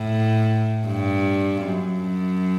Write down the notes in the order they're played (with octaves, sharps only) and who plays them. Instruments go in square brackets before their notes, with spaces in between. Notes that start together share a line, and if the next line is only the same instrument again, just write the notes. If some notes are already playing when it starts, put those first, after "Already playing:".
Already playing: [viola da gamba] A2
G2
F#2